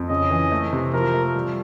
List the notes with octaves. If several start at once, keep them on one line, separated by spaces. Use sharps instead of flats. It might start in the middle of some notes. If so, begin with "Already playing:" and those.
Already playing: F2
C#3 D#5
E3
A3
C3
F3 A#4
A3
G3